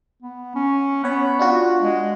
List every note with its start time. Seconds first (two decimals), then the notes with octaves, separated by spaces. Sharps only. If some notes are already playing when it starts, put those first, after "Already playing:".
0.23 B3
0.55 C#4
1.04 B3 C#5 F#5
1.39 D4 F4 F#4
1.81 G#3